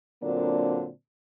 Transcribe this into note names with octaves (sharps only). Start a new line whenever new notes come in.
A#2 D3 F#3 A#3 C4 D4